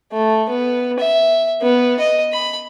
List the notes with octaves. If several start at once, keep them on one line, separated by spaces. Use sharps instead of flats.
A3
B3
E5
B3
D#5
B5